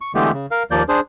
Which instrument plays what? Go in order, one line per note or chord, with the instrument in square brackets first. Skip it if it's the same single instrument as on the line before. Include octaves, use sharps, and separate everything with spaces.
[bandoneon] C#6
D3 E3 G#3 A3 B3 G4
C#3
A#4 F5
D#2 F3 A#3 D5 G6
D4 G#4 C5